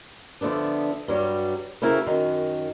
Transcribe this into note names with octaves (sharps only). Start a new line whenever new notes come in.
D3 F3 A3 B3 D4
G2 F#3 G3
C#3 A3 C4 E4 F#4 A#4
F#2 D#3